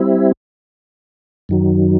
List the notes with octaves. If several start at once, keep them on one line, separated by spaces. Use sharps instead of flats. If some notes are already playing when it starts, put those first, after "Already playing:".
Already playing: G3 C4 E4
F#2 D#3 F#3